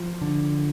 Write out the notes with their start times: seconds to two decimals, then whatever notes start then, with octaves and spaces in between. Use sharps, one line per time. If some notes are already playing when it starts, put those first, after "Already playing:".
Already playing: F3
0.22 D3